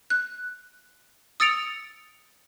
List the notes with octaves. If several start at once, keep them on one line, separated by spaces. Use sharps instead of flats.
F#6
D#6 E6 A6 C#7 D7 F7